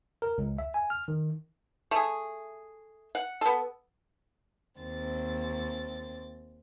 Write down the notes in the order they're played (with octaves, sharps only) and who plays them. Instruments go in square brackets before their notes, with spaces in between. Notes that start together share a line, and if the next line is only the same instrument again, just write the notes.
[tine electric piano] A#4
C#2
E5
G#5
F6
D#3
[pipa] A3 G#4
F#5
B3 A4
[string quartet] D#2 C4 A6